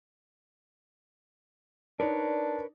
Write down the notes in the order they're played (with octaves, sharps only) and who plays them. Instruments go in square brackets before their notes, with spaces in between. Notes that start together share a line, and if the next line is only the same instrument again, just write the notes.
[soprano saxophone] D4 [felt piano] D#4 D5 [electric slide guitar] A#4 B4 C#5